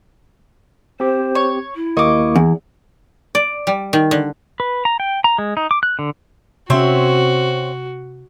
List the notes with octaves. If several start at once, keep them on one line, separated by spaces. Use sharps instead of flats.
C4 G4 C5
C#5
E4
D#2 A#3 D#5 C#6 D6
E2
D5
G3
D#3
D3
B4
A#5
G5
A#5
G#3
D#4
D6
F#6
D3
C3 C4 C#4 F#4 C#5 E5